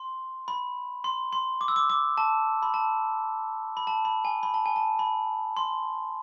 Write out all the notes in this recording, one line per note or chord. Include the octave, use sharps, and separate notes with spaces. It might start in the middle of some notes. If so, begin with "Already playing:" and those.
Already playing: C6
B5
C6
C6
D6
E6
D6
D6
A5
B5
A5
B5
A5
B5
G#5
B5
A5
G#5
A5
B5
C6